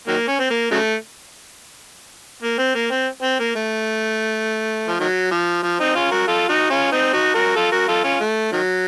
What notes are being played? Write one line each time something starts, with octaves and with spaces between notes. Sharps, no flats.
D#3 F#3 A#3
C#4
C4
A#3
C#3 F#3 A3
A#3
C4
A#3
C4
C4
A#3
A3
F3
D#3 F#3
F3
F3
C4 D#4
C#4 F4
F#4 A#4
F4 A4
D#4 F#4
C#4 F4
C4 D#4
D#4 F#4
F#4 A#4
F4 A4
F#4 A#4
F4 A4
C#4 F4
A3
D#3 F#3